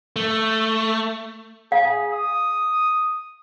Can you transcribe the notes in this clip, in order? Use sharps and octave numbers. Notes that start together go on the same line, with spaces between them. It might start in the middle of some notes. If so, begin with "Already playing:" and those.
A3
G#4 F5
D#6